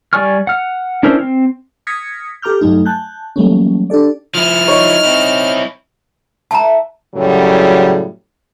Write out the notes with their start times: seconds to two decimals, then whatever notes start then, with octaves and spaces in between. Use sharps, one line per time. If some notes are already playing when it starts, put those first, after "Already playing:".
0.13 G3 D5 G#5 C#6 F6
0.47 F#5 F6
1.03 C#4 D4 E4 A#4 C5
1.20 C4
1.87 D#6 F6 G#6 A#6 B6 C#7
2.42 G4 A4 A#5 D6 F6 G6
2.61 G2 F#3 A3 D#4
2.85 G#5 A5 F#6 G6
3.36 E3 F#3 G3 A3 A#3 C#4
3.90 D4 G4 A4 D5
4.35 F3 E4 F6
4.67 D#4 C#5
5.05 C4 E4
6.51 E3 A3 E4 A5 A#5
7.14 F#2 A2 C#3 F#3 G3